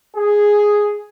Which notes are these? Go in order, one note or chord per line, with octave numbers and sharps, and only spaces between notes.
G#4